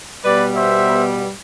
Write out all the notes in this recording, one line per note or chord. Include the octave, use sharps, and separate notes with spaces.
B2 G3 B3 B4 D5
C5 E5